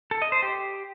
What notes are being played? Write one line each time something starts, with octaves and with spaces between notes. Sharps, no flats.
A4
D#5
C5
G4